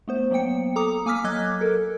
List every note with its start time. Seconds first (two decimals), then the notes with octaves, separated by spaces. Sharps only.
0.08 A3 B3 C5
0.31 F#3 A#3 B3 G5 C#7
0.76 A4 A#5 D6 D#6
1.06 A#3 G#5 D6 E6 F6 B6
1.24 F#3 D#5 D6 F#6 G#6
1.61 A4 A#4